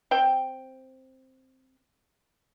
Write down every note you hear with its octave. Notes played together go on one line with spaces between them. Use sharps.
C4 G5